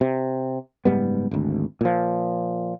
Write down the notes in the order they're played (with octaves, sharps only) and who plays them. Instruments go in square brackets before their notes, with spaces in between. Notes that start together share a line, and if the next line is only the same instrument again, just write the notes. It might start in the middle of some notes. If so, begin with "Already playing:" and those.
[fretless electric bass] C3
F#1 G#2 G3 B3
G#1 D2
A#2 F3